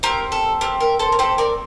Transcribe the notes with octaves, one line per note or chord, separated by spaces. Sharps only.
C4 G4 A#4
A4
C4 G4 A#4
A#4
A4 C5
A#4
C4 G4 A4 C5
A#4 D5